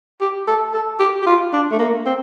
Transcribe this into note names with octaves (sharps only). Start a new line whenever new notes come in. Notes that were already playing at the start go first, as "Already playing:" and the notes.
G4
A4
A4
G4
G4
F4
D4
A3
A#3
C4